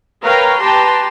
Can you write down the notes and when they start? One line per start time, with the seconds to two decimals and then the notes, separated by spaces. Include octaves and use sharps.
0.22 A#4 B4 C#5 F5 G5 A#5
0.60 G4 B4 G5 A5 A#5 C6